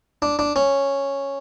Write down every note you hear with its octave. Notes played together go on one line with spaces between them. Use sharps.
D4
D4
C#4